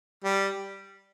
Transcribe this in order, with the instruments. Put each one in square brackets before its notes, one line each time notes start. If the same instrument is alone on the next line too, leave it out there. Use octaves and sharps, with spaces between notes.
[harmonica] G3